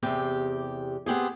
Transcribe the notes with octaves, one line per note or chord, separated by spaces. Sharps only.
E2 C3 G4
B3 C4 G4 G#4